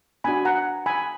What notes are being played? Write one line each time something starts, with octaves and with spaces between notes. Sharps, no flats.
B3 D4 F#4 G#5 B5
F#5 A#5
G#5 B5